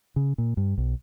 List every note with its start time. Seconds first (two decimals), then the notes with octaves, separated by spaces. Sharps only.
0.16 C#3
0.38 A#2
0.57 G2
0.78 B1